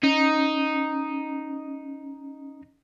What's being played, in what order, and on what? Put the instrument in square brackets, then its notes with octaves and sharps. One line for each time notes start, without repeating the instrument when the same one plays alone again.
[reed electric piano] C#4 [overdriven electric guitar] D#4